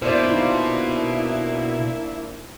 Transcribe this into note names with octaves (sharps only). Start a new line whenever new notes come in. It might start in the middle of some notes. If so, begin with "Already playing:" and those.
B2 A#3 D4 E4 C5 D5
D#4 F4